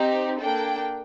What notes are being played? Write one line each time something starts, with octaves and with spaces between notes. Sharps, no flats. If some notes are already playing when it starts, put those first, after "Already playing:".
Already playing: C4 D#4 G4
A#3 D4 A4 G5